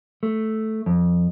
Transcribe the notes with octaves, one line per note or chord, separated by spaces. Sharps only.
A3
F2